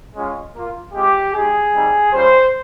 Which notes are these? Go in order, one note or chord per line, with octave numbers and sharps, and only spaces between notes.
G#3 C#4 F4
A#3 F4
G#3 C4 F4 G4
G#3 D#4 G4 G#4
G3 C4 D#4
G3 C#4 F4 C5